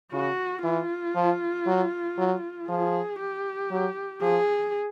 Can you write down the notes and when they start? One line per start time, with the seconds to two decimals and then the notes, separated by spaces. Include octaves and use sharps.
0.12 C#3 F#4
0.64 E3 F4
1.15 F3
1.67 F#3
2.18 F#3
2.69 F3 G#4
3.20 G4
3.71 F#3
4.22 F3 G#4